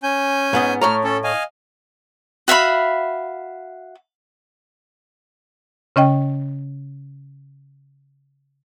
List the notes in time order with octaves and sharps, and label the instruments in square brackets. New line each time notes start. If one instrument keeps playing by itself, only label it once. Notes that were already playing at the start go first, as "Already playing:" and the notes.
[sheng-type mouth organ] C#4 G#5 G6
[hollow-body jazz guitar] G#2 B3 D#5
[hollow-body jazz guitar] A2 C#5 A#5 [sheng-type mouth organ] F6
[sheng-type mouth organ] C#4 A4
D#5 F5 G#5
[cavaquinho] F#4 E5 F5 B5
[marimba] C#3 C#4 D#5 G5